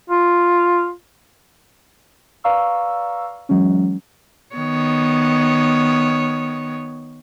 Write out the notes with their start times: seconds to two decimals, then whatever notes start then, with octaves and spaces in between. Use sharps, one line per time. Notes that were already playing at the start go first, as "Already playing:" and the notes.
0.10 F4
2.44 B4 D5 F5 A#5 C#6 E6
3.49 E3 F#3 G#3 C#4
4.55 D#3 B3 C#5